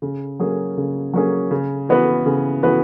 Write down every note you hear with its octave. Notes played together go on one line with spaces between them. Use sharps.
C#3
F#3 A#3 C#4 G#4
C#3
F#3 A#3 C#4 G#4
C#3
E3 B3 F#4 B4
C#3
E3 B3 F#4 B4